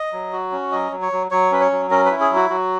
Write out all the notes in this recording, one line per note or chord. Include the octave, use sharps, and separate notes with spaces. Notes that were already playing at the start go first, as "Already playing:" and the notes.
Already playing: D#5
F#3
F#4
C#4
F#3 D#5
F#3
C#5
F#3
F#3 C#5
C#4 B4
C#5
F#3
C#4 A#4
B4
E4
G#4
F#3
F#4
F#3 F#4